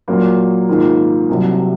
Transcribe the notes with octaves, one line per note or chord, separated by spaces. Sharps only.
A#2 F#3 A#3
G#2 D#3 A#3 F4
C2 C3 F#3